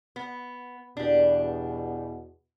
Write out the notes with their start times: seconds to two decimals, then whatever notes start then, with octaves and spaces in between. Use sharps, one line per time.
0.16 B3
0.97 E2 B2 D4 G4